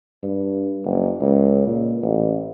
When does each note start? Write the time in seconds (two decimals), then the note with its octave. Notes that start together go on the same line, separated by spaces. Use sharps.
0.23 G2
0.85 F#1
1.21 C#2
1.67 A#2
2.03 A1